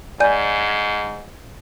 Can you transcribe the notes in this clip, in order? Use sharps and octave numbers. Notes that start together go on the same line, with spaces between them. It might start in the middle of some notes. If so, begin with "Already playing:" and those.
G#2 D5 G#5 G6